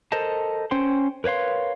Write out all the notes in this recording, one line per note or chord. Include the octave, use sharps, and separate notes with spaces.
A4 A#4 C5 D#5 A5
C#4 C5 G5 C6
A#4 B4 C#5 F5 C6